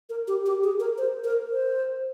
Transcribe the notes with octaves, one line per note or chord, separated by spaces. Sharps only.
A#4
G4
G4
G#4
A#4
C5
A#4
C5